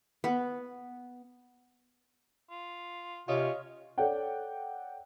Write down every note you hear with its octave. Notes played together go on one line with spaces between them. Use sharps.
B3
F4
C3 C#4 F4 C#5 D#5 F5
A4 C#5 D5 F#5 G5